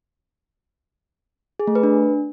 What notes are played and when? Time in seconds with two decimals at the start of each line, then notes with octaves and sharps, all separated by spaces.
1.59 G#4
1.67 A3
1.75 B4
1.83 D4